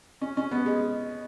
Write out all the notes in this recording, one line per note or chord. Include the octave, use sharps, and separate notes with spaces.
C#4
C#4
B3
G#3